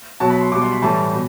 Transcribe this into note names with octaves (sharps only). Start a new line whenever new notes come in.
B2 F#3 A5
B5
C6
B2 G3 D6
C6
B5
A2 E3 G3 A5
B2